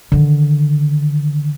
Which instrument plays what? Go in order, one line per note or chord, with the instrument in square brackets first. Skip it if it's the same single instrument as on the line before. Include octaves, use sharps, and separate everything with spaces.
[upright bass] D3 D#3